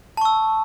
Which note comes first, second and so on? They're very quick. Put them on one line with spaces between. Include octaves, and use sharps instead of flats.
A5 C#6 E6